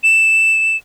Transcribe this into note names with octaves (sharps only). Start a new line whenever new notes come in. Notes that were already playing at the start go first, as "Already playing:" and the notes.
E7